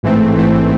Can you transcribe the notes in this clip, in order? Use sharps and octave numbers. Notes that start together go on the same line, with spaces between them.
A1 G#2 E3 A3 C4
A1 G#2 E3 A3 C4